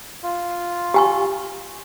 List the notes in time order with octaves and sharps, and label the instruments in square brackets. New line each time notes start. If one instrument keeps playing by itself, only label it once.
[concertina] F4
[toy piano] G4 G#5 C#6